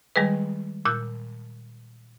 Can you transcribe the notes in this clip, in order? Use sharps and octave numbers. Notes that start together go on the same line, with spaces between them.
D#3 G3 G#3 G#4 B4
A#2 E6 F#6 G6